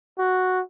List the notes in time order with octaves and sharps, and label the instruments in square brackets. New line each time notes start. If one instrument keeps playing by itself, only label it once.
[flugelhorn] F#4